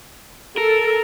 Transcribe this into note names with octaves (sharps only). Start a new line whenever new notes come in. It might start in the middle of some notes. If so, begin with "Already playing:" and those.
A4 A#4